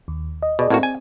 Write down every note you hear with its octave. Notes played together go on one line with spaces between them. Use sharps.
D#2
D#5
B2 G#4 D5 D#5
A2 A#3 C4 F#4
G#5